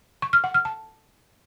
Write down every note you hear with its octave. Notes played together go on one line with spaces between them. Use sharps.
C#6
F6
F#5
F6
A5